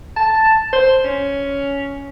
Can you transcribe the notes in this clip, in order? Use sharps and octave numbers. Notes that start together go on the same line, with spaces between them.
A5
C5
C#4